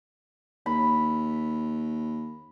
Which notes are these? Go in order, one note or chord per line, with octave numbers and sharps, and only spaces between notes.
D#2 B5